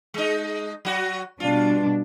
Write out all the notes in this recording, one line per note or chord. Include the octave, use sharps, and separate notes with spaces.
G#3 D#4
F#3 F#4
B2 G3 D4 F4